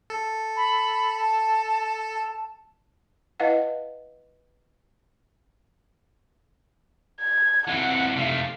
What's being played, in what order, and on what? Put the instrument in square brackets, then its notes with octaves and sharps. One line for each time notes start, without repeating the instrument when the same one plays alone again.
[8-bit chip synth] A4
[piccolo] B5
A5
[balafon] E4 B4 D#5 F5 F#5
[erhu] G#6
[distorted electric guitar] E3 C4 [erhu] F#5
[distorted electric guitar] C3 A3 [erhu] F5